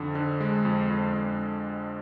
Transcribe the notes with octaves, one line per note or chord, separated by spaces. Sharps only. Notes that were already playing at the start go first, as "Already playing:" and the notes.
Already playing: F2 D3
D3
G#3
F2
F2
F2